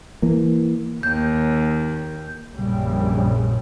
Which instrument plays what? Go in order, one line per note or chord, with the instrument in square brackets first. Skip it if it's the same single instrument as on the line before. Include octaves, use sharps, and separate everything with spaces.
[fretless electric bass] E3 A#3
[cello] D#2 [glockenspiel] G6
[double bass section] A#1 F#2 A#2 C#3 G3